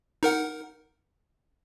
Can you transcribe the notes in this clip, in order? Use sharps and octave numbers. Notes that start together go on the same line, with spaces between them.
D#4 A#4 F#5